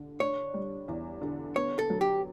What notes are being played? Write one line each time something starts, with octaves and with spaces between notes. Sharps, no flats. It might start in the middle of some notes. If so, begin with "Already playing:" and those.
Already playing: D3
D4 C#5
G3
E2
D3
B3 C#5
A4
F#3
G4